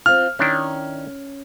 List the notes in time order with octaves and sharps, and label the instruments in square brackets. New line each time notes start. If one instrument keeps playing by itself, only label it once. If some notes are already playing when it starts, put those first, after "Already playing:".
[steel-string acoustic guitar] C4 F4 [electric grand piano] F6
[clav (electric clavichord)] D#3 D4 E4 [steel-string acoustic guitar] C#4